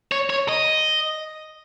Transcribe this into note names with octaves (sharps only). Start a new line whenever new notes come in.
C#5
C#5
D#5